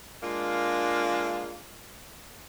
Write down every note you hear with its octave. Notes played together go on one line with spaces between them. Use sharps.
G#3 A#3 D4 F4